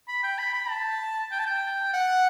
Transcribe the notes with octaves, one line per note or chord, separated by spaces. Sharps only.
B5
G5
B5
B5
A5
G5
A5
G5
F#5